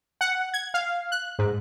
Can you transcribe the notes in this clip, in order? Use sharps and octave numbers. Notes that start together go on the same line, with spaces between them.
F#5
G#6
F5
F#6
G#2